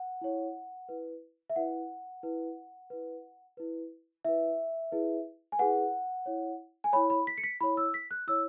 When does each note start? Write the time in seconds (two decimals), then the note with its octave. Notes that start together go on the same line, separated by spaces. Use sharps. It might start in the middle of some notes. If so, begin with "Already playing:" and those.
Already playing: F#5
0.21 E4 C#5
0.89 E4 B4
1.50 E5
1.56 E4 B4 F#5
2.23 E4 B4
2.90 E4 B4
3.57 E4 B4
4.25 E4 B4 E5
4.92 E4 G#4 B4
5.52 G#5
5.59 E4 G#4 B4 F#5
6.26 E4 C#5
6.84 G#5
6.93 E4 C#5 B5
7.10 B5
7.27 B6
7.38 C#7
7.44 B6
7.61 E4 C#5 B5
7.77 E6
7.94 B6
8.11 F#6
8.27 E4 C#5 E6